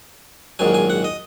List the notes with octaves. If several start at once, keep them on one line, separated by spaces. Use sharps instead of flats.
A#1 G#2 D#3 F#3 G#5
G#5
F#5
D#5